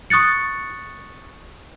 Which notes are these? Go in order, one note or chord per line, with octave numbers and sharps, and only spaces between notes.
C#6 D#6 F#6 A6 C#7